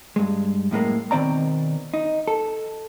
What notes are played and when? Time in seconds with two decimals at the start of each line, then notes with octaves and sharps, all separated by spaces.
0.16 G2 G#3
0.71 F#2 A2 G#3 A#3
1.11 B2 D#3 C4 D5 A#5
1.94 D#4
2.28 A4